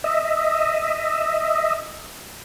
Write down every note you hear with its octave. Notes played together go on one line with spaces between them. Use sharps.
D#5 E5